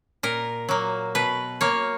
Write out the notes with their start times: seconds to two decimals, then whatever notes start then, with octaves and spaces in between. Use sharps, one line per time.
0.23 A#2 A#4
0.69 F#3 A#3
1.15 B2 B4
1.61 A#3 C#5